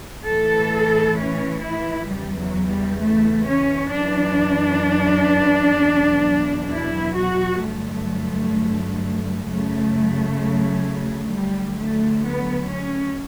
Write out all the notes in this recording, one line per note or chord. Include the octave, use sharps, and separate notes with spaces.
A2 E3 A4
C#4
E4
E2 C#3 E3 G3
F#3
G3
A3
C#4
F#2 E3 D4
E2 B2 F#3
E4
F#4
G2 D3 F#3 A3
F#2 C#3 F#3 A3
D2 D3 F#3 G3
A3
B3
C#4